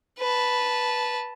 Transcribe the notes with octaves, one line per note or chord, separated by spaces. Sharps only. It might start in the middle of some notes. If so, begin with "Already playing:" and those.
B4 A5